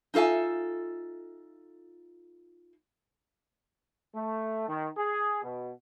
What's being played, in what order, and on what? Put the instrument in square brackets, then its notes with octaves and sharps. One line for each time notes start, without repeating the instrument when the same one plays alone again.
[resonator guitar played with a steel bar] D#4 F4 A4 E5 G#5
[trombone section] A3
D#3
G#4
B2